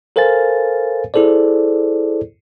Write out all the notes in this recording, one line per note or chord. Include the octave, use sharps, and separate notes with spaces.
A4 A#4 C5 F5 G#5 A6
E4 G#4 A4 C5 D5